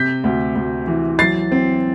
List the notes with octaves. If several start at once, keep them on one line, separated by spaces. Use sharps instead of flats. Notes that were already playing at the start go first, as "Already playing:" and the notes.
Already playing: C3 G6 B6
D2
D2
E3
F#3 A6 C7
C4